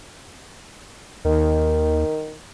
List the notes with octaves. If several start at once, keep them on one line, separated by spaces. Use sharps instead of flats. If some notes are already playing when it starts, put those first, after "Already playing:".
D#2 D#3